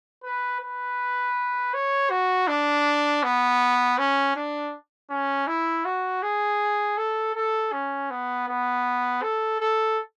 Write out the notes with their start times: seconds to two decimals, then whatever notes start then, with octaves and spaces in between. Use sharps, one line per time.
0.24 B4
0.61 B4
1.73 C#5
2.10 F#4
2.48 D4
3.23 B3
3.98 C#4
4.36 D4
5.10 C#4
5.47 E4
5.85 F#4
6.22 G#4
6.97 A4
7.35 A4
7.73 C#4
8.11 B3
8.47 B3
9.22 A4
9.60 A4